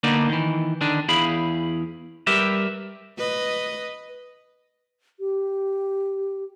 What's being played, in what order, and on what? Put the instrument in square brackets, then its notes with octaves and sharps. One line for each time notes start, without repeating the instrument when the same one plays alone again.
[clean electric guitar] D3 A#3 B3 D4 D#4
D#3 E3
D3 D#3 D4
E2 E4 G#4 F5 B5
G3 G4 A#4 B4 E5
[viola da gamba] B4 D#5
[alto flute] G4